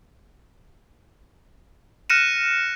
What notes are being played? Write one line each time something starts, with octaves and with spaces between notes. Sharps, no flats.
F6 F#6 A#6 C#7 D#7 E7